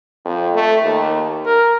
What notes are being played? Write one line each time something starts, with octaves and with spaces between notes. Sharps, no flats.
F2
A3
D#2
A#4